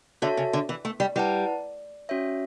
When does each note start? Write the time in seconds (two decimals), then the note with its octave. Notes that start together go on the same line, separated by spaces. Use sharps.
0.22 D3 F#4 A4 C#5 E5 A5
0.37 C#3
0.53 D3
0.69 E3
0.85 A3
1.00 G3
1.16 G3 E4 B4 F#5 A5
2.09 C#4 F#4 C#5 E5